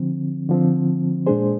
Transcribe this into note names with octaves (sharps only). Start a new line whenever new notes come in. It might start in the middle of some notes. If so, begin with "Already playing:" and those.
Already playing: D3 F3 C4
D3 F3 C4
A#2 G#3 D4 G#4 C5